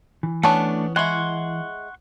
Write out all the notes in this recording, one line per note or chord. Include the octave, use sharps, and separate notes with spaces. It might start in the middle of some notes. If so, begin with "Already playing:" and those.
E3
A3 B3 C#4 D4 A5
G#3 E4 F#5 C6 C#6